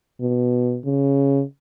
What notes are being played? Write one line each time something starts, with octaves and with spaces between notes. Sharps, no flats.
B2
C#3